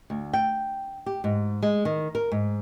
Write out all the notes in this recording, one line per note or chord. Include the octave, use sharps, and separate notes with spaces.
D2
G5
G4
G#2
G#3
D#3
A#4
G#2